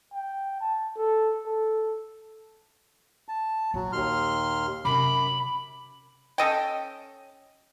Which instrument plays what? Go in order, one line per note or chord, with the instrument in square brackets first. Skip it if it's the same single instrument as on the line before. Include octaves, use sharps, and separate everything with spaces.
[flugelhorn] G5
A5
A4
A4
[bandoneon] A5
[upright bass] A#1 E4 [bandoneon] F#3
[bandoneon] D#2 C6 F6
[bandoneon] F#2 D6 [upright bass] C3 [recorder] B5
[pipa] C#4 A4 D#5 G5